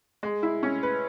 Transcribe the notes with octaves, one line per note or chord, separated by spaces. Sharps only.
G#3
E4
C#4
B4